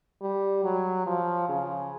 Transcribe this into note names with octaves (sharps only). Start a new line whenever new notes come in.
G3
F#3
F3
C#3